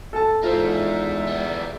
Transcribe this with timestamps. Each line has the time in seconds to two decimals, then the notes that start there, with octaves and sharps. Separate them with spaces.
0.13 A4 A5
0.44 E2 G#3 D#4 F4 A4 C5 E5
1.27 G3 B3